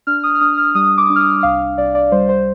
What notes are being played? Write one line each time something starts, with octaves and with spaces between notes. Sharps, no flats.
D4 F6
D#6
F6
D4 D#6
F6
G3 D#6
D6
D4
F6
D#6
C2 F5
C2 D5
D5
G3 C5
C5